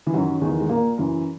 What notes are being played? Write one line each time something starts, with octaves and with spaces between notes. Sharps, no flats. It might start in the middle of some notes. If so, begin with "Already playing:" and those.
E3
F#2 D#3 F#3
E2 D#3
G#3
A#2 A#3
F#2 E3